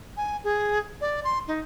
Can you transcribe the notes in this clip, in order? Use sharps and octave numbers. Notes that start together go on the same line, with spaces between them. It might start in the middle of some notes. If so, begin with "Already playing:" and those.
G#5
G#4
D5
C6
D#4